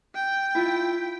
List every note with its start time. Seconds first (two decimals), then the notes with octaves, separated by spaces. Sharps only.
0.15 G5
0.55 E4 F4